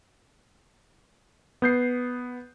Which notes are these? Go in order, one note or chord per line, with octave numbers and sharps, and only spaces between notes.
B3 G6 C7